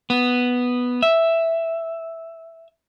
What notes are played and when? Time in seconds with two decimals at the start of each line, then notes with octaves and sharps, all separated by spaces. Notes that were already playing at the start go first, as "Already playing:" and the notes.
0.10 B3
1.03 E5